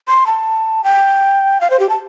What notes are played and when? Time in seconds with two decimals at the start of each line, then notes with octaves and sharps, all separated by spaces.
0.08 C6
0.27 A5
0.84 G5
1.61 F5
1.70 C5
1.80 G4
1.89 A5